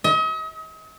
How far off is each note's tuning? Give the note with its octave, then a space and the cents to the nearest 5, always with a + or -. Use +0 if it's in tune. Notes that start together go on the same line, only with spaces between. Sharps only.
D#5 +40